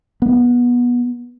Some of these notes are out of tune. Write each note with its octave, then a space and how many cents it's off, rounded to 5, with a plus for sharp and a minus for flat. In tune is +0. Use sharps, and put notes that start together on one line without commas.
B3 -20